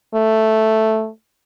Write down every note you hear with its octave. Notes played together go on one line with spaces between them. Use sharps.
A3